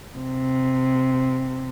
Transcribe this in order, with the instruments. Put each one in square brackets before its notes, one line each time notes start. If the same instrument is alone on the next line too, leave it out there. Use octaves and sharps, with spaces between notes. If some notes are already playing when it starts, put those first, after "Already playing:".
[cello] C3